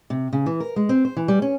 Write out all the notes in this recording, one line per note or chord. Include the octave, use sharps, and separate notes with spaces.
C3
C#3
E3
A#4
G#3
C4
C5
E3
G3
C#4